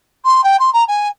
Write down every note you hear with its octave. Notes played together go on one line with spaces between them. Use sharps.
C6
G5
C6
A#5
G#5